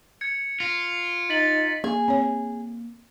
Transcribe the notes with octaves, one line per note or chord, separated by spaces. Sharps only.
G#6 C#7
F4
D#4 A6 B6 F#7
A#3 G#4
C4 C#5